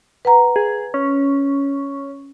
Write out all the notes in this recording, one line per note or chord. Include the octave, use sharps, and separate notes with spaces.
B4 F#5 A#5
G#4
C#4